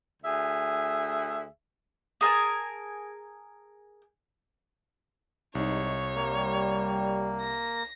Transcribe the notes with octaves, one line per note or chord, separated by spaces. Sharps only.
D2 G#4 E5
G#4 A#4 G#5 A5
C2 G#2 G3 D#4 C#5
G3 A#3
A#6